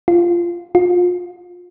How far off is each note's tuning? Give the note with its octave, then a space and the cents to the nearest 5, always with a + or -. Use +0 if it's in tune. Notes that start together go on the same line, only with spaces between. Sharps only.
F4 -15
F4 +25